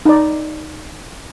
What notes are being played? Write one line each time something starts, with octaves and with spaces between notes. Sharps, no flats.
D#4 D5